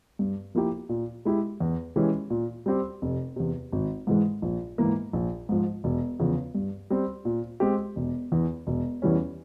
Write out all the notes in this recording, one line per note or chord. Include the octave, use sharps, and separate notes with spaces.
G2
F3 A#3 E4 G4
A#2
G#3 E4 G4
E2
E3 G#3 C#4 G4
A#2
G3 C4 G4
F1
E2 C3
G#1
G#2 E3 G#3
A#1
G#2 E3 A#3
A#1
G#2 F3
E1
E2 C#3 F3
G2
G3 C4
A#2
G#3 C4 G4
E1
E2 E3
E1
E2 E3 G3 C#4